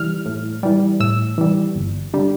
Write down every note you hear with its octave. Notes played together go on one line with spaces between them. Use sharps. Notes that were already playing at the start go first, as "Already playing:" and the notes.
Already playing: E3 G3 F6
A2
E3 G3
A2 E6
E3 G3
G1
D3 G3